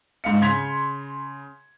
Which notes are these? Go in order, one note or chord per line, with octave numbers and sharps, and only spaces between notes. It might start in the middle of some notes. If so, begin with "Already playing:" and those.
G#2 F5 C#7
C#3 C6 G#6 B6 F7